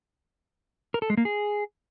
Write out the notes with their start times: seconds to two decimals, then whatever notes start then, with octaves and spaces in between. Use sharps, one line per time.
0.94 A#4
1.02 A4
1.10 G#3
1.17 A#3
1.25 G#4